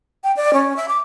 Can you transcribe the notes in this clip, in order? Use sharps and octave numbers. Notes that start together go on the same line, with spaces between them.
G5
D5
C#4
E5
D6